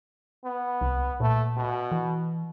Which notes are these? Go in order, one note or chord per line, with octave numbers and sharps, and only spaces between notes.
B3
C2
A#2 A3
B2
E3